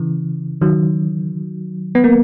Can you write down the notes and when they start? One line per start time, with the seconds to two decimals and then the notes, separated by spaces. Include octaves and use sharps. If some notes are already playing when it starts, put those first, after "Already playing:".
Already playing: C#3 E3
0.61 D#3 F#3
1.95 B3
2.04 A#3